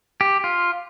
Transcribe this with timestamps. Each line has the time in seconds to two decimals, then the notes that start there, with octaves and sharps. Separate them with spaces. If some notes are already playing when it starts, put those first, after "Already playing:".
0.21 G4
0.44 F4